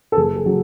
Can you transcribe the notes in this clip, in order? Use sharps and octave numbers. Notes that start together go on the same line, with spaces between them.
A4
F#1 G#4
G#4
C#3 F#3